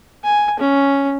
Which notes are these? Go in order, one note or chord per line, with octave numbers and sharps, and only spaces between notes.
G#5
C#4